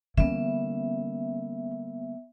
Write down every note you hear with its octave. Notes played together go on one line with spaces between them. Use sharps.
D3 E3 G3 A#3 B3 C#4 E5